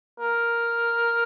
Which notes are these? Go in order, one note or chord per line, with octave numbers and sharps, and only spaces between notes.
A#4